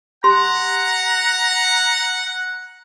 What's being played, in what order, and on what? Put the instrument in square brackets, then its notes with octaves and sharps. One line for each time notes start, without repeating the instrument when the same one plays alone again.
[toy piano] G4 C6 [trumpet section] F#5 [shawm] A#5